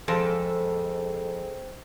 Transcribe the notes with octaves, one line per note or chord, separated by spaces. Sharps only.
F2 G#3 C4 A4